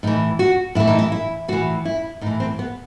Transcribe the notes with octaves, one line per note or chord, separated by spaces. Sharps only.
A2 E3 D#4
F#4
A2 E3 E4
D#4
E4
E4
A2 E3 F#4
E4
A2 E3 D#4
C4
B3